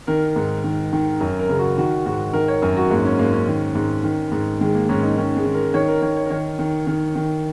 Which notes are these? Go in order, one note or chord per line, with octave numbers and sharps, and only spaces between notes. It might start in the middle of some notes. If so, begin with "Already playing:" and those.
D#3 A#4
G#2
D#3
D#3
F#2 A#4
A#4
C#3
F#4
D#3 F#4
G#2 F#4
D#3 A#4
C#5
F#2 A#4
F#4
G#2 A#3
C#4
G#2 A#3
C#4
D#3
G#2
D#3
G#2
D#3 G#3
A#3
G#2 C#4
D#4
D#3 C#4
G#3
D#3
A#4
D#3 C#5
A#4
D#3 C#5
C#5
A#4
D#3 C#5
D#3
D#3
D#3